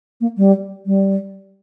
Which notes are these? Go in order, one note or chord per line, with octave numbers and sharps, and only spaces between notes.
A#3
G3
G3